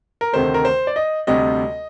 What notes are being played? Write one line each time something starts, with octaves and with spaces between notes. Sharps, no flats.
A#4
D2 C3 D#3 A3 C5
A#4
C5
D5
D#5
D2 C3 G3 D#5